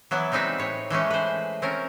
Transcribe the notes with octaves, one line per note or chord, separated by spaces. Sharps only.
E3 F#3 B3 E4
G3 G#3 C4 D#4 B4 E5
A2 C#5
E3 G#3 A3 C#4
B4 C5
C4 C#4 A#4